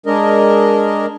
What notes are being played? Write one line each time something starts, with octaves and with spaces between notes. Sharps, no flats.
G#3 D4 A#4 D#5